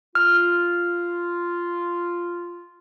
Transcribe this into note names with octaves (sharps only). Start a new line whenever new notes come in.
F4 F6